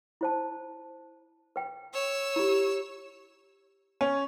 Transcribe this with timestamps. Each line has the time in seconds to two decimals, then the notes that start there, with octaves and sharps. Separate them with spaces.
0.21 E4 C5 A5
1.56 B4 G5
1.93 C#5 E6
2.36 E4 G4
4.01 C#4